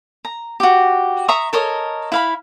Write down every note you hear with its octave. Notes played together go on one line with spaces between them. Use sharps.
A#5
F#4 G4
E5 A#5 C#6 D#6
A4 A#4 C#5 D#5
E4 F5 B5